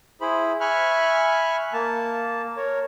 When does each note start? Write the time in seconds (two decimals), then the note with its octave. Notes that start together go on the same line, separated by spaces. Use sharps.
0.21 E4 G#4 C5 B5
0.61 E5 G#5 B5 C#6 F6 F#6
1.73 A#3 A5
2.57 A#4 C#5